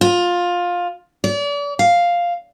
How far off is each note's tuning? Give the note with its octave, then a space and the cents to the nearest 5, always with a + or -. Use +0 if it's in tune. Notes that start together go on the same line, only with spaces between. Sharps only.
F4 +15
D5 -40
F5 +0